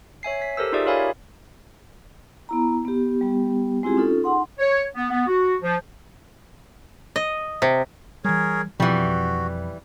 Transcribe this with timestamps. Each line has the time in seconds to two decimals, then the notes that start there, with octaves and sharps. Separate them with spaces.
0.23 C#5 E5 G#5 C7
0.42 B6
0.57 G4 A4 A#4 C5 E6
0.72 D#4 F4 G4 G#4 D5 E5
0.85 F4 A#4 C#5 F5 G#5 B5
2.49 B3 E4 A#5
2.85 B3 G4
3.21 G3 B3 G4
3.83 G#3 C4 E4 F4 G4 G#4
3.97 C#4 D#4 F4 A4
4.24 D#4 G#4 F#5 C6
4.59 C#5
4.95 B3
5.10 B3
5.27 F#4
5.62 F3
7.16 D#5
7.62 C3
8.24 E3 G3 G#4 A#4 C#5
8.80 F2 B2 E3 G3 F#4